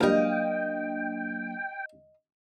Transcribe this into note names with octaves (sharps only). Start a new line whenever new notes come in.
C#2 F#3 G3 A#3 D4 D#5 F5 G5